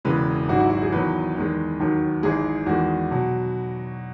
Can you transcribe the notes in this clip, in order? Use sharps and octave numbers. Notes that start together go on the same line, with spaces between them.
E1 E2 C#3 E3 G#3 B4
G#1 G#2 F#3 F#4
E4
F#4
G#4
E2 D#3 F#3 B4
E2 D#3 G#3
D#2 D#3 F#3
G#1 G#2 E3 G#3 G#4
E2 D#3 G#3 F#4
B2 F#3